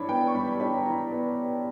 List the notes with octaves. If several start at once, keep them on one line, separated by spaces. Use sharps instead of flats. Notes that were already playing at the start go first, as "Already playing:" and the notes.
Already playing: G2 E3 D4 C#5 D5 B5
B3 G5
C#6
G2 B5
B5
D4 B5
A#5
E3 A#5
B3